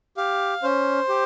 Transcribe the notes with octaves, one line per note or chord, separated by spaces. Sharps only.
G4 F5
C#4 C5
G4